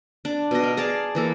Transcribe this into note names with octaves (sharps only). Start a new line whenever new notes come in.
D4
B2 D#5
A#4
G#4 D5 F5 A5
E3 A#3 A4